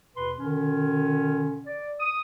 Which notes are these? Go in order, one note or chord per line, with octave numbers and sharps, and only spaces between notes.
E2 B2 B4 B5 C6
B2 D3 D#3 C#4
D5
D#6